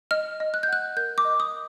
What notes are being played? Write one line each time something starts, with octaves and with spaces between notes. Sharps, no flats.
D#5 F6
D#5
F#6
G6
F#5 F#6
A#4 G6
D6
D#5
D#6